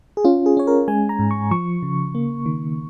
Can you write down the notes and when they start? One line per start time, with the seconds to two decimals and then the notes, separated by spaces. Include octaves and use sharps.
0.17 G#4
0.25 C#4 F4
0.46 G#4
0.57 C#4 C#5
0.67 A#4
0.88 G#3 G#5
1.09 A#5
1.19 G#2
1.31 C#6
1.51 F3 C#6
1.83 C#3
2.15 A#3
2.46 D#3